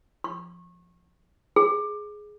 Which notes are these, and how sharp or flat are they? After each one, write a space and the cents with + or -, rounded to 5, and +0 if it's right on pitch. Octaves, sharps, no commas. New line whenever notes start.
C#6 -30
G#4 +10